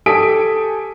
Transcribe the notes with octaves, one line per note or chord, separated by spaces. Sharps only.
G4 A4 G#5 D#6 B6 D7